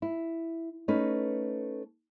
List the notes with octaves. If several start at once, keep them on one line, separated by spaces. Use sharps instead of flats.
E4
A3 C#4 D#4 B4